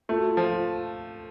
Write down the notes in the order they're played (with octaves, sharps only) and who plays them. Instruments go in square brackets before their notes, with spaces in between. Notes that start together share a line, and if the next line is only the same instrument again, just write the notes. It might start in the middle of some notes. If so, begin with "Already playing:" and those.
[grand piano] A3 [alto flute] F4
[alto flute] F#4
F4
[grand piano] F3